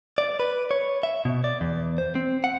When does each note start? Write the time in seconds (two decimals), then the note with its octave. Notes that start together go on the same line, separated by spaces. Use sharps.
0.18 D5
0.40 B4
0.71 C#5
1.03 E5
1.25 B2
1.44 D5
1.61 E2
1.98 C5
2.15 C4
2.44 F#5